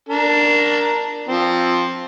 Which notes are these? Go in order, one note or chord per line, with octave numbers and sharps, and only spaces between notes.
D4 A#4
F3 C4